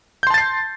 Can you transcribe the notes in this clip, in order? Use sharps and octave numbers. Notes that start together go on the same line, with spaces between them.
A5 C6 G6 A6 C7